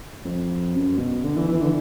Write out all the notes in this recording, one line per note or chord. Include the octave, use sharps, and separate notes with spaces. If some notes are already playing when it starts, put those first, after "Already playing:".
F2
F#2
B2
D3
E3
E3
D3